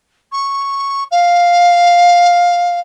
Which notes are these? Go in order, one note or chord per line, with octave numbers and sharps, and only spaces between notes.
C#6
F5